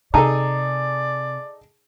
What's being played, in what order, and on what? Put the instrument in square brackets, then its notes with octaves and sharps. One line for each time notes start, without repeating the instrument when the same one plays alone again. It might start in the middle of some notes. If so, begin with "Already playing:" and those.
[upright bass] C3 [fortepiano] D#4 G#4 A4 [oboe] D5 [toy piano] A5 A#5